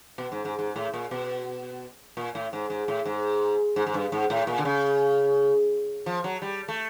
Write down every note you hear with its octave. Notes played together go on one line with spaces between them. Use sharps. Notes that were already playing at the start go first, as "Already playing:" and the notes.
B2
G#2
G#2
G#2
A2
A#2
B2
A#2
A2
G#2
G#2
A2
G#2
G#2
G#2
G2
G#2
A2
A#2
D3
C#3
F3
F#3
G3
A3